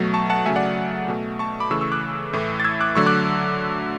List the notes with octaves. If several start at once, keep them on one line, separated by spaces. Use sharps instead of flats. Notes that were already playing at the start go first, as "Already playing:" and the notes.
Already playing: B2 F#3 A3
A5 C#6
F#5 A5
C#3 F#3 A3 E5 G#5
D5 F#5
B2 A3
A5 C#6
B5 D6
C#3 E3 A3 C#6 E6
C#6 E6
D6 F#6
A2 E3 A3
A6
E6 G#6
D6 F#6
D3 F#3 A3 C#6 E6
D6 F#6